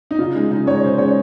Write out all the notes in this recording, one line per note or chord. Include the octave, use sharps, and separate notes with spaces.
D#4
C#3 F4
G#3 D#4
C#3 D#4
G#3 C#5
C#3 C5
G#3 C#5